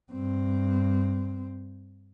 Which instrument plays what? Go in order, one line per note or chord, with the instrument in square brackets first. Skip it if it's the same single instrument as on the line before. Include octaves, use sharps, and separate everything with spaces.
[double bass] G2 C4